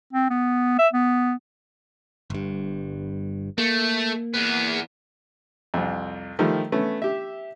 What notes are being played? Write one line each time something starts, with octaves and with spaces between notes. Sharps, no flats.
C4
B3
E5
B3
G1 G2
A3 A#3
E2 B3
C2 F2
D#3 F3 G3 A3
A3 B3 C#4
G4 E5